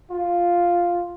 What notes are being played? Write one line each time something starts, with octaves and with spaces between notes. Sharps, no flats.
F4